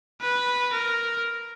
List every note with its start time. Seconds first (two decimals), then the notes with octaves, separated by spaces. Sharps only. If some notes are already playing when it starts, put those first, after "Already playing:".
0.22 B4
0.73 A#4